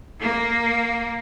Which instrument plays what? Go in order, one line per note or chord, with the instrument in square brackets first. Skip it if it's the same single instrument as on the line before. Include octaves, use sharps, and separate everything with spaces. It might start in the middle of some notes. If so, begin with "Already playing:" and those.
[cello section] A#3